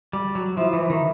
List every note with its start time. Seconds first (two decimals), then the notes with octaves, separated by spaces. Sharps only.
0.13 G3
0.35 F#3
0.57 F3 E4
0.73 E3
0.90 D#3